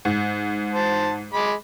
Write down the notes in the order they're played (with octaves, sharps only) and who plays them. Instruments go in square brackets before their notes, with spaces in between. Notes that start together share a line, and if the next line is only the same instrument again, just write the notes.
[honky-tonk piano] G#2
[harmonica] C5 A5
G#3 B5 D6